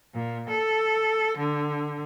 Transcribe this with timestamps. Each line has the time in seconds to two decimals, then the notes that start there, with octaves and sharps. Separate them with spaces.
0.14 A#2
0.49 A4
1.37 D3